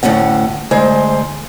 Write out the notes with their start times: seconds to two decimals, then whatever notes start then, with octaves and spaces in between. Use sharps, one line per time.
0.03 D2 A2 D3 C#4 F#5
0.71 D2 G#3 C5